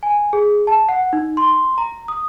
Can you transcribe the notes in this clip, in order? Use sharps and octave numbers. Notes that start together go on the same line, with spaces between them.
G#5
G#4
A5
F#5
D#4
C6
A#5
D#6